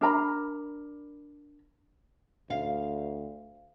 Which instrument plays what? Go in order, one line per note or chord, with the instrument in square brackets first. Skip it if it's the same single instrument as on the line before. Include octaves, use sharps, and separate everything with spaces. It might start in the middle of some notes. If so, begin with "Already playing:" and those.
[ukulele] D4 A#4 A#5 B5
[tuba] D2 [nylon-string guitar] F5